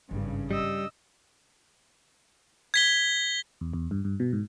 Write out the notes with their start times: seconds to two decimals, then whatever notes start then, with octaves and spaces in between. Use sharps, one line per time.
0.11 G#1 G2 C#3
0.51 G3 D#5 E6
2.74 G#6 B6 G7
3.61 E2
3.73 E2
3.91 G2
4.05 G2
4.20 B2
4.33 G#2